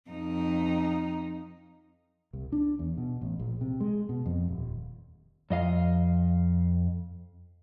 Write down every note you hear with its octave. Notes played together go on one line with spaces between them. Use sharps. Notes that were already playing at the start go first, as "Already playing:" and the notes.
F2 D#4
C2
D4
E2
B2
A1
A#1
C3
G#3
B2
F2
D#1
F2 D#5 F5